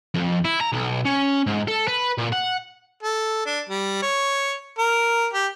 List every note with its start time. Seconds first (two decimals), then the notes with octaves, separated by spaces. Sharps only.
0.14 F2
0.45 E4
0.61 A#5
0.73 B1
1.05 C#4
1.46 G#2
1.68 A4
1.88 B4
2.18 A#2
2.32 F#5
3.03 A4
3.46 D4
3.69 G3
4.02 C#5
4.79 A#4
5.33 G4